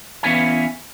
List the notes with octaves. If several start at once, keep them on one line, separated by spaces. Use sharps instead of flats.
E3 B3 C#4 E4 F5 G#5